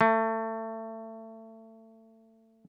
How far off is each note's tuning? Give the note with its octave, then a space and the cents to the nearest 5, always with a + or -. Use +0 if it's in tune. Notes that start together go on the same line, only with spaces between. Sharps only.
A3 +25